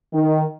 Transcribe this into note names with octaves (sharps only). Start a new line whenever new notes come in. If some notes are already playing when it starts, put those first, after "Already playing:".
D#3